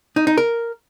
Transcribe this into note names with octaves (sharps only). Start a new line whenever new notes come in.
D#4
D#4
A#4